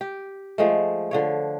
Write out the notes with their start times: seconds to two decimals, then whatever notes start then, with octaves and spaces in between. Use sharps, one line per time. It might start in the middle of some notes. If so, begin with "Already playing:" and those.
0.01 G4
0.58 F3 G#3 A3
1.11 D3 F3 C#5